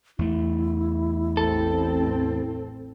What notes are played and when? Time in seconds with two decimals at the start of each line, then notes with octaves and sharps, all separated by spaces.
0.19 E2 A3 E4
1.37 A1 C4 A4